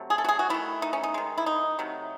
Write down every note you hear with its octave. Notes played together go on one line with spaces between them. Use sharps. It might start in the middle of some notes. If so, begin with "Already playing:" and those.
Already playing: C3 F#3 A3
G#4
A4
F#4
G#4
F#4
D#3 A3 E4
D#4
C#4
D#4
D#3 G#3
E4
D#4
C3 F#3 A3